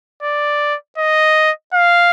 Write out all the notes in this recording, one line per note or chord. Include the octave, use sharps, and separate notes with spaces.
D5
D#5
F5